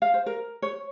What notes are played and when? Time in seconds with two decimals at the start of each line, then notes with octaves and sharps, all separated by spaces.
0.02 F5
0.14 C5
0.26 A#4
0.62 C#5